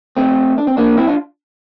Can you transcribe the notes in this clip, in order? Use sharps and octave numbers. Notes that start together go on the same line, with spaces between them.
A3 C4
D4
C4
A#3 D4
C4 E4
D4 F4